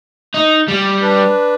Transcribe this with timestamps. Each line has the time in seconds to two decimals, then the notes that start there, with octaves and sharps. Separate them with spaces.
0.34 D#4
0.68 G3
1.02 D4 B4